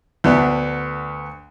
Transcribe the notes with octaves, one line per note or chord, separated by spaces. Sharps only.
D2 B3 D4